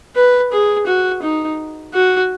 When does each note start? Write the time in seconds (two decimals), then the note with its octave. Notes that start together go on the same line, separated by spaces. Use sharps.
0.16 B4
0.52 G#4
0.87 F#4
1.22 D#4
1.94 F#4